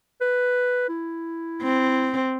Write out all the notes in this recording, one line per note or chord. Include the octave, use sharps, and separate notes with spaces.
B4
E4
C4